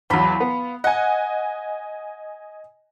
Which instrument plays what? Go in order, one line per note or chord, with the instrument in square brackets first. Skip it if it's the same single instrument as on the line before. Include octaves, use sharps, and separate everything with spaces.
[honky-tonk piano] E2 F#3 [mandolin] F4 B5
[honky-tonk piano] B3
[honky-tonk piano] D#5 G#5 [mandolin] F#5